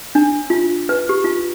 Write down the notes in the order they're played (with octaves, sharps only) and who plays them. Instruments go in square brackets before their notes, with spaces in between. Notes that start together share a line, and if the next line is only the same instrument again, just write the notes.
[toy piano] D4
F4
B4
G4
F4